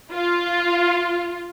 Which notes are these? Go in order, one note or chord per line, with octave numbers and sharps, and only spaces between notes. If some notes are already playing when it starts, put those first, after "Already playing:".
F4